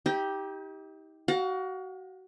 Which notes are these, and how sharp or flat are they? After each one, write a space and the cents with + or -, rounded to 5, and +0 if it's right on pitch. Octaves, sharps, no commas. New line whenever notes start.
D#4 +40 G4 +0
F#4 +25 F5 +45